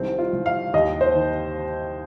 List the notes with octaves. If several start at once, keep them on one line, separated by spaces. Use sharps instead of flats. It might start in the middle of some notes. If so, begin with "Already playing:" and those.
Already playing: C2 D#3 C4
F4
C2
F5
D#2 D#5
C5
D#3